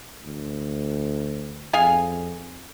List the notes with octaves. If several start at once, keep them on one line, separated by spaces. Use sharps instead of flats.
D2
F2 G#4 F5 G#5